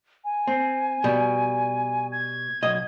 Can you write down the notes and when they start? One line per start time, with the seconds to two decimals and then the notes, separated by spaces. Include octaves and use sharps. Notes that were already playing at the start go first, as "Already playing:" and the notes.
0.25 G#5
0.47 C4
1.04 B2 G3
2.12 G#6
2.62 B1 D#5